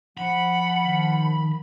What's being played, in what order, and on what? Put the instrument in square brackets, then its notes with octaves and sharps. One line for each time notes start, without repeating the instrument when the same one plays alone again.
[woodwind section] F3 [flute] F#5 [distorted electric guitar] B5
[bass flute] D#3